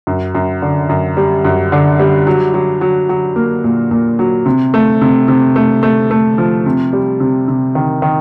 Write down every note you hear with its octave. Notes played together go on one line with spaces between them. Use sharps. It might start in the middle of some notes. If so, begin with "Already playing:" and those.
F#2
F#2
D3
F#2
G3
F#2
D3
G3
F#3
F#3
F#3
F#3
A#3
A#2
A#2
F#3
C3
A3
C3
C3
A3
A3
A3
F3
C3
G3
C3
C3
D#3
D#3